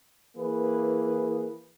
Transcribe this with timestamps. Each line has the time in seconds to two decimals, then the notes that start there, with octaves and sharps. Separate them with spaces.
0.36 E3 A#3 G#4 B4